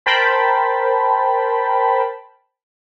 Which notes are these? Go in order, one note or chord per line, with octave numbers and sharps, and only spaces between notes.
A#4 C5 G5 A5 B5